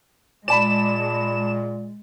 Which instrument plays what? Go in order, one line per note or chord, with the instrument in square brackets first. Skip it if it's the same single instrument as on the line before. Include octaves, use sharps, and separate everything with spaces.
[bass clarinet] A#2 [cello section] G#3 [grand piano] D5 A5 B5 [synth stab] E7